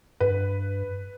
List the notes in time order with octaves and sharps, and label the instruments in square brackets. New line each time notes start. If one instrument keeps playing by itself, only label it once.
[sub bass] G2 [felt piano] B4